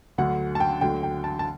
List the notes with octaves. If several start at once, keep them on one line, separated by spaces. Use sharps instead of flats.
D2 D3 F#3 F#5
A5
G5
D2 D3 F#3 G5
G5
A5
A5